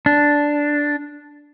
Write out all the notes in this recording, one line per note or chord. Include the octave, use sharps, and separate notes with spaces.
D4